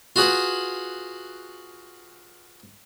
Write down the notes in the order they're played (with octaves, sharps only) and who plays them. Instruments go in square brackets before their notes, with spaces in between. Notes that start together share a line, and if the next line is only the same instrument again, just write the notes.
[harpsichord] F4 F#4 G#4 B4 F#5